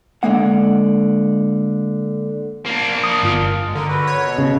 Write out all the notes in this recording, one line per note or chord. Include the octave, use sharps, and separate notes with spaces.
D3 G#3 A#3 F#5
A#3 D4
D#6
G1 F4 F6
G#3
D3 A#4
F#4 B4
C#5
B2
C#3